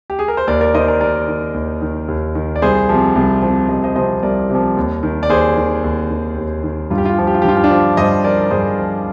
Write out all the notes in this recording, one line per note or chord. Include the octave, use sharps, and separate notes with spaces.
G4
G#4
A#4
C5
D#2 A#4 D5
A#4 D5
D#3 C5 D#5
A#4 D5
D#2 A#4 D5
D#3
D#2
D#3
D#2
D#3
D5
C2 G#4 C5
C3 F3
C2
C3 F3
C2 D#5
C5 D#5
C3 F3 C5 D#5
C2 A#4 D5
C3 F3
D#2
D#3
D5
D#2 G#4 C5
D#3
D#2
D#3
D#2
D#3
G2 F4
G4
F4
G4
F3 F4
G4
F4
G4
G2 F4
G4
D4 F4
F3
G2 C5 D#5
F3 A#4 D5
A#4
G2 G#4 C5
F3